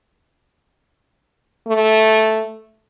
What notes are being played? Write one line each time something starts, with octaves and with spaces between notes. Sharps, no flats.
A3